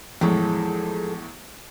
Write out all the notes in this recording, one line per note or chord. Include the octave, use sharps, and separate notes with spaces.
E2 A2 F3 G#3 A4